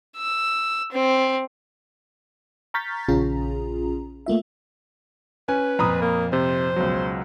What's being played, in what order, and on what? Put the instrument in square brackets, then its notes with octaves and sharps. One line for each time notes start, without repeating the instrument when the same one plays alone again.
[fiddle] E6
C4
[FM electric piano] A#5 C#6 F6 G6 A6 B6
A#1 C#3 C#4 F4 G#4 A#5
A3 A#3 F4 E5
[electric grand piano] C#4 [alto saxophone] B4 [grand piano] G#5
[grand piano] F2 A#2 [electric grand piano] A#5 B5 D#6
[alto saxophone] A#3
[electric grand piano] C3 [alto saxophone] C5
[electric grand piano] C#2 B2 F#3